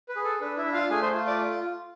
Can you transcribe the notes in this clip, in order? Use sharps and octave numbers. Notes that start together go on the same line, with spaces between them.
B4
G#4
A4
D4 B4
E4 E5
D4
F4 F5
A3 G#4 G#5
C5 C6
F4
D5 D6